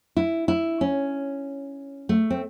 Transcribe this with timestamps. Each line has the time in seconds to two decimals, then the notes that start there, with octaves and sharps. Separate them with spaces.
0.17 E4
0.48 E4
0.81 C#4
2.09 A3
2.30 C4